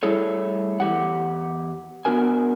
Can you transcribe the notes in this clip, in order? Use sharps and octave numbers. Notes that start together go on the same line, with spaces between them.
G3 A3 E4 G#4 A4 C#5
E2 G4 F#5
B3 D4 F#4 A#4 G#5